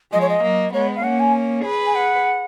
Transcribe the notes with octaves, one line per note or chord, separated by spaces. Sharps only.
F3 G#3 D#5
C#5
D#5
F#3 A#3
G#3 B3 C#5
F5
A#3 C#4 F#5
G#5
G#4 B4
G#5
F#5